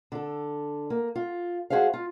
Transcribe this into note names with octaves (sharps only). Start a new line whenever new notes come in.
D3 A4
A#3
F4
G#3 F#4 G#4 C5 E5 F5
F4